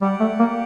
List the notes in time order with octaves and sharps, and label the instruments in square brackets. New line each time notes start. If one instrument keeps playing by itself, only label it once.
[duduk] G3 [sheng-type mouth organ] G4 D5 F#5
[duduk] A3
A#3